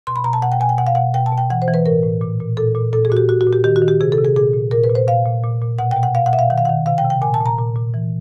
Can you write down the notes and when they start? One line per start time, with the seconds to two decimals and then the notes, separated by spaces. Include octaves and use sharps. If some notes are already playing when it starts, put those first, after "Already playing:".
0.07 B2 C6
0.16 B5
0.24 B2 A#5
0.33 A5
0.42 B2 F#5
0.52 G5
0.60 B2 G#5
0.69 G5
0.78 B2 F#5
0.87 F5
0.95 B2 F#5
1.14 B2 G5
1.26 A5
1.32 B2
1.38 G5
1.50 E3 F#5
1.62 C5
1.68 E3
1.74 B4
1.86 A2 A#4
2.03 A2
2.21 A#2
2.40 A#2
2.57 A#2 A4
2.75 A#2
2.93 A#2 A4
3.05 G#4
3.10 A#2 F#4
3.17 G4
3.28 A#2 F#4
3.41 F#4
3.47 A#2
3.53 G4
3.64 D#3 G4
3.76 F#4
3.82 D#3
3.88 G4
4.00 C3 G#4
4.12 A4
4.18 C3
4.25 G#4
4.36 A#2 G#4
4.54 A#2
4.71 A#2 A#4
4.84 B4
4.90 A#2
4.95 C5
5.07 A#2 F5
5.26 A#2
5.43 A#2
5.62 A#2
5.79 B2 F#5
5.91 G5
5.97 B2
6.03 F#5
6.15 B2 F5
6.26 F#5
6.33 B2 E5
6.39 F5
6.50 D#3 F#5
6.58 F5
6.65 F#5
6.69 D#3
6.86 C3 F5
6.98 G5
7.04 C3
7.10 G5
7.22 A#2 G#5
7.34 A5
7.40 A#2
7.46 A#5
7.58 A#2
7.76 A#2
7.94 E3